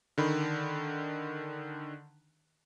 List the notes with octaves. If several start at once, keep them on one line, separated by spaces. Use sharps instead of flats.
D3 D#3 B5